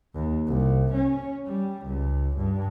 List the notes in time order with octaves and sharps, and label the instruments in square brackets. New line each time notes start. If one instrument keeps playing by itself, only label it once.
[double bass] D#2
C2
C#4
G3
C#2
G2